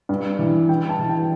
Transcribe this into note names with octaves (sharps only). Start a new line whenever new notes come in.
G2
E3
G2 G5
A5
E3
G5